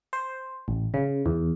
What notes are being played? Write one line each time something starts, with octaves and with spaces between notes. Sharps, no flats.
C5
A1
C#3
E2